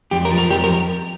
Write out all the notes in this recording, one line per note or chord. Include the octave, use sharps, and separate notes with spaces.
F2 G4
A#4
F3
A#4
F2 G4
A#4